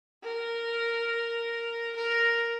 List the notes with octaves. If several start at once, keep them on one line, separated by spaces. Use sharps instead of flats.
A#4
A#4